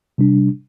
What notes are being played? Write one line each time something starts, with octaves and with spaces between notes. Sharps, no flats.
C3 G3 D4